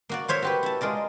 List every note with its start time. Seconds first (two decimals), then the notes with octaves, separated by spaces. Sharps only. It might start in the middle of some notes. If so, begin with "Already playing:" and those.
0.09 A#3 F#4 D5
0.28 F4 C5 C#5 E5
0.42 F#4 G4 B4
0.63 E4 A5
0.81 G#3 F4 A#4 D5